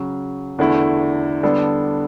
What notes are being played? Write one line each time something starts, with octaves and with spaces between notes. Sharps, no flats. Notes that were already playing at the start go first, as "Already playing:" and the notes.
Already playing: C#3 F#3 C#4
E2 D3 A3 E4
D3 G3 B3 D4 A4